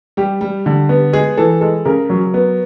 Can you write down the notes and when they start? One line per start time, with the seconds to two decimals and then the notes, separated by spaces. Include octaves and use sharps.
0.17 G3 G4
0.41 G3
0.66 D3
0.89 B3
1.13 G#3 G#4
1.37 E3 A4
1.61 G#3 A4
1.85 C#3 A#4
2.10 F#3
2.34 B3